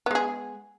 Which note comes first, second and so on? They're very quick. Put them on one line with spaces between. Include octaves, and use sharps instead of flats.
B3 G#3 G#4